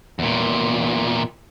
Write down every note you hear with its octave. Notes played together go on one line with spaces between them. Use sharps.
E2 A#2